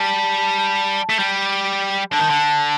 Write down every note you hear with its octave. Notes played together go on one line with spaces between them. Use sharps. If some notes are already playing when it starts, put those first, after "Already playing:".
Already playing: G3 A5
A3
G3
D3 A5
D#3
D3